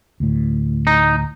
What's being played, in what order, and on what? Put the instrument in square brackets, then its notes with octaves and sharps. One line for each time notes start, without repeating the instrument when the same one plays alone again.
[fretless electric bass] D2 A2
[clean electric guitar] D#4